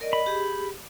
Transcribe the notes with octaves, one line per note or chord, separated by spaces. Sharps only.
A#4 D5 D#5
D#5 B5
G4 G#4